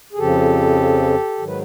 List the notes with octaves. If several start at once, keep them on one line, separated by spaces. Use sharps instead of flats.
G#4
F2 C#3 F3 G4 A4
G#2 D#3 F#3
B4